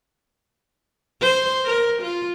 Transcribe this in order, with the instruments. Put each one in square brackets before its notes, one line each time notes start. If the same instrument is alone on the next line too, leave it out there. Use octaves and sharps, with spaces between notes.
[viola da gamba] C5
A#4
F4